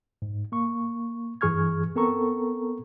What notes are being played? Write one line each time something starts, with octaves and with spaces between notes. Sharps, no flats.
G#2
A#3 C#6
G2 E3 G#4 C#6 F6 G#6
B3 C4 A4 A#4 A#5 C#6